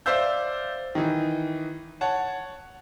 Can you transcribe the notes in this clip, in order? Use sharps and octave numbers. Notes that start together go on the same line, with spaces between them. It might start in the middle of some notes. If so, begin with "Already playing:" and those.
C5 D5 E5 F5 E6 G6
D#3 E3
C#5 F#5 A5